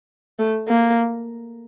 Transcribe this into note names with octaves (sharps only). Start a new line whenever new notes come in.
A3
A#3